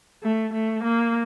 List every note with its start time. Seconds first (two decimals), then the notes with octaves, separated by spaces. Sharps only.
0.23 A3
0.53 A3
0.84 A#3